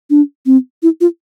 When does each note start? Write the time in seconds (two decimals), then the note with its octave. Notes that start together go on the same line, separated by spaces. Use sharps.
0.10 D4
0.46 C4
0.83 E4
1.01 F4